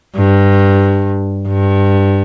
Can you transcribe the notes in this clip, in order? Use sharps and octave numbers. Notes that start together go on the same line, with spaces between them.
G2
G2